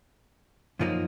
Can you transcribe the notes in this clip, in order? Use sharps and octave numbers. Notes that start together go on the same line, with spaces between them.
F#2 F3 A#3 D#4